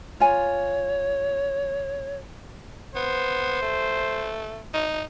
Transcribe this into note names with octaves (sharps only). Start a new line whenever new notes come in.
F4 C#5 G#5
B3 C5
A3
D#4